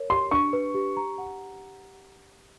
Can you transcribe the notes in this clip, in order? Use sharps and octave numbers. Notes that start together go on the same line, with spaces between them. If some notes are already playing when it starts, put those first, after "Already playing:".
Already playing: A#4 C#5
G4 C6
D4 C#6
B4
G4
A#5
F#5